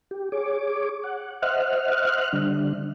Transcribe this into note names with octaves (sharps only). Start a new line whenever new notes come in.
G4
G#4 C#5 D6
F#5
C5 D#5 E5 F#5 F6 F#6
D3 G3 D4